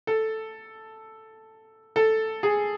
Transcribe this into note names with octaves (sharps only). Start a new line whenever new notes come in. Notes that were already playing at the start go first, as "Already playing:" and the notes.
A4
A4
G#4